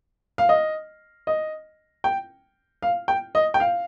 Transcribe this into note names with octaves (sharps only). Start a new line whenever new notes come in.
F5
D#5
D#5
G5
F5
G5
D#5
G5
F5